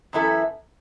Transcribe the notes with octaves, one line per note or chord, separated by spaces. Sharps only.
F#2 E3 B3 E4 A4